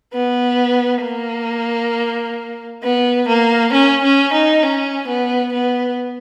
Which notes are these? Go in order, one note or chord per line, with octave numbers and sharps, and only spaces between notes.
B3
A#3
B3
A#3
C#4
C#4
D#4
C#4
B3
B3